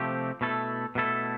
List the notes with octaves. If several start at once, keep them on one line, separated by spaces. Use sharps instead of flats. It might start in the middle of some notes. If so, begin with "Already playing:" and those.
Already playing: C3 F3 A3 C4 G4
B2 A3 E4 A4
B2 A3 E4 A4